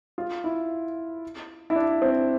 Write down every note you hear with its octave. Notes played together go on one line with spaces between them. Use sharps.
F4
E4
E4
D4
C4